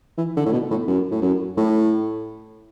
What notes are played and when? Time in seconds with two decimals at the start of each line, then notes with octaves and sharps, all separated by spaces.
0.18 E3
0.36 D3
0.46 A2
0.53 B2
0.71 A2
0.88 F#2
1.11 A2
1.22 F#2
1.57 A2